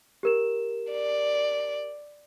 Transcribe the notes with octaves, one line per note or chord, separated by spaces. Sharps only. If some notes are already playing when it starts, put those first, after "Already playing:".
G4 A#4 E7
D5